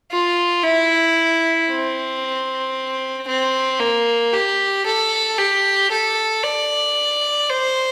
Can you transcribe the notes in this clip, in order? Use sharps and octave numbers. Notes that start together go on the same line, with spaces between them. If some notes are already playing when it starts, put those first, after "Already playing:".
F4
E4
C4
C4
A#3
G4
A4
G4
A4
D5
C5